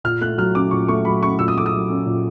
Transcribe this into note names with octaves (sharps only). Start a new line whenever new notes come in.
A#2 F6
A3 F#6
F#3 F6
C#4 D6
A#2 C#6
A3 C#6
F#3 B5
C#4 C#6
A#2 E6
D#6
A3 D6
D#6
F#3
C#4
A#2